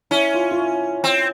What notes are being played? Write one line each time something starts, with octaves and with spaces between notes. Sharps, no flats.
C#4 E4
F4
F4
E4
C4